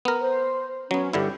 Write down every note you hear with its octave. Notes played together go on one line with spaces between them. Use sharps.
B3 A#4
C5
F#3 B3 C#4
G2 D3 E4 G4